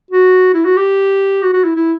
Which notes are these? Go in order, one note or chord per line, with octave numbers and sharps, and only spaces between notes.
F#4
E4
F#4
G4
F#4
F#4
E4
E4